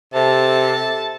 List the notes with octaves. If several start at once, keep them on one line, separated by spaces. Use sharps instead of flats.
C3 A4 A5